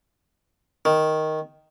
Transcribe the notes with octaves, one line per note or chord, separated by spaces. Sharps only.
D#3